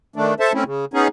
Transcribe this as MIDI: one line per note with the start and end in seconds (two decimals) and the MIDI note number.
0.16 0.34 51
0.16 0.34 57
0.16 0.34 62
0.40 0.53 69
0.40 0.53 72
0.40 0.53 76
0.40 0.53 81
0.54 0.64 57
0.54 0.64 60
0.54 0.64 61
0.54 0.64 64
0.66 0.85 49
0.94 1.08 59
0.94 1.08 61
0.94 1.08 63
0.94 1.08 68